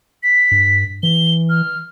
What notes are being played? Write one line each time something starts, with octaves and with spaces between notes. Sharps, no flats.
B6
G2
E3 G7
F6